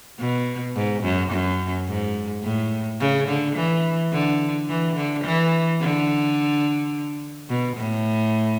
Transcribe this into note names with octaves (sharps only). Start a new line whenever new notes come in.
B2
G#2
F#2
F#2
G#2
A2
C#3
D3
E3
D3
E3
D3
E3
D3
B2
A2